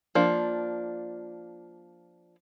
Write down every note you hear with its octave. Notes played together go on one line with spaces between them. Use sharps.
F3 A#3 D4